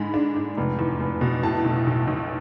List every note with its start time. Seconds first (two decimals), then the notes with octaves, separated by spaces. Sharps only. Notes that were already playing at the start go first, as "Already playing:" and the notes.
Already playing: G#2 D3 G#3 B5
0.14 D4
0.36 G#2
0.57 F1
0.79 E2
1.00 F1
1.21 B2
1.43 A2 A5
1.64 B1
1.87 B1
2.07 B1